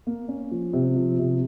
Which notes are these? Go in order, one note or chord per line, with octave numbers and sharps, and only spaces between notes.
A#3
C#4
F3
C3
F3
C3